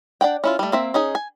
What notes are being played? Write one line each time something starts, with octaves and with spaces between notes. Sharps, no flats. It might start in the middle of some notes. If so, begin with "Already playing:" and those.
D4 D5 F#5 G5
C#4 E4 F4
G3 A3
A#3 C4 E5
C#4 D#4 G#4
G#5